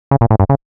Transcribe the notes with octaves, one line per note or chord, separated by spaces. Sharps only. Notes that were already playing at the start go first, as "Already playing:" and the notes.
C#3
A#2
A2
G2
C#3